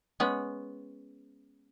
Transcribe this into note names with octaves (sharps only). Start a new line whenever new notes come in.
G#3 B3 C#4